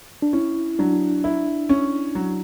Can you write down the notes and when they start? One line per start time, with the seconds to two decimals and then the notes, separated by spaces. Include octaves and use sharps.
0.22 D4
0.33 C#4 E4
0.79 F#3 D4
1.24 E4
1.69 C#4
2.15 F#3